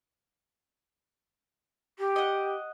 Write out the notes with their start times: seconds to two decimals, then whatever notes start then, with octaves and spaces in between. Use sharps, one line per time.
1.99 G4
2.16 D#5 F#5